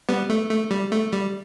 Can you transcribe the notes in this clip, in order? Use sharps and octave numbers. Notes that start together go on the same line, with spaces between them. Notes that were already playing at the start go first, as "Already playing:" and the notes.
G3 B3
A3
A3
G3
A3
G3